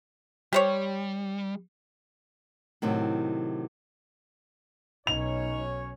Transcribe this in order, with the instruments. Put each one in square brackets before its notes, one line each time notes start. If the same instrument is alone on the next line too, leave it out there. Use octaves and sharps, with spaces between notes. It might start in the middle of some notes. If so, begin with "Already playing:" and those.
[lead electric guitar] G3 [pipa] G4 C5 C#5
[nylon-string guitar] A2 C3 D#3 F#3
[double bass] B1 [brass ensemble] F#3 C#4 C#5 [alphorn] D#4 [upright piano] F7